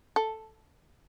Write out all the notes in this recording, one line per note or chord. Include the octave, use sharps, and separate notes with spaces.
A4